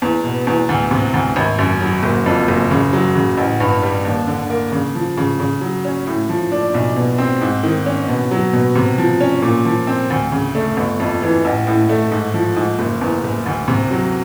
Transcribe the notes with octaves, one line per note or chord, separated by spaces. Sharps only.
E2
B2
E2
D2
C3
D2
G#1
F#2
F#3
F#1
F2
F#1
C#3
F#3
C#3
A1
G2
G3
D#2
D3
A#3
C#3
F3
C#3
C#3
F#3
C#4
A2
F3
D4
B1
B2
C4
G#2
D#3
C#4
B2
F#3
B2
C3
F3
C#4
A#2
F3
C4
D2
C#3
A3
G1
F2
E3
A1
A2
A3
G#2
F3
G#2
F#1
E2
F#1
D2
C3
F#3